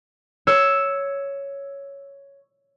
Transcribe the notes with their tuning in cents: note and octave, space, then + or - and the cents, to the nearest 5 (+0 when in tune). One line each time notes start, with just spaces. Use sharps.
C#5 +5 E6 +0